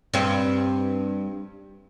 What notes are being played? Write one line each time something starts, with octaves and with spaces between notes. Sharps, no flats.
G2 C4